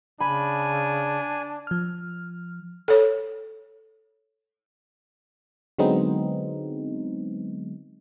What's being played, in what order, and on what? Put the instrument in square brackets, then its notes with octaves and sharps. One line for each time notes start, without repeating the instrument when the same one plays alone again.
[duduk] C#3 [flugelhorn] D4 [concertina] G#5 [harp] B5
[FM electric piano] F3 F6
[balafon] A4 C#5
[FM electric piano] D3 F#3 G#3 B3 C4 D#4